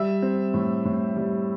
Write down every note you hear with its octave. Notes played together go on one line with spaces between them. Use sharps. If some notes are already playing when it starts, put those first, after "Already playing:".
Already playing: G3 E5
C4
A2
A2
G3